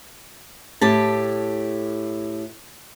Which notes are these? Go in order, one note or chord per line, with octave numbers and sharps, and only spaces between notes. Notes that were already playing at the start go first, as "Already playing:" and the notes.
A2 G4 A5